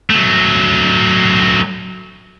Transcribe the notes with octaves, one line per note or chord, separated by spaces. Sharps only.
F#3 A3